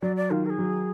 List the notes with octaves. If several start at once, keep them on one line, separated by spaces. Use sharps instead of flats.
F#3 D5
D5
D#3 F4
A#4
G#4
F#3